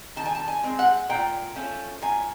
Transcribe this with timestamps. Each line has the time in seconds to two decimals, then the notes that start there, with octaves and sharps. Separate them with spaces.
0.16 D#3 A5
0.26 G#5
0.35 A5
0.48 G#5
0.63 G#3 C4
0.79 F#5
1.09 A#2 G5
1.55 F3 A3 C#4
2.02 A#2 G#5